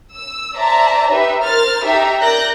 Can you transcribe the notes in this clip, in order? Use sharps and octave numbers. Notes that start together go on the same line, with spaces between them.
E6
C5 D5 E5 A5 A#5
D#4 G4 B4 E5
A#4 C5 F6 A6
D#4 G4 A4 E5 A#5
A#4 D5 F#6 G6 A#6